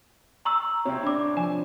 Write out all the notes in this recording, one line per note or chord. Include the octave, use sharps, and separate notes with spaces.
A#5 C#6 E6
C3 C4 C#5
D4 B5 D6
F3 G#5 E7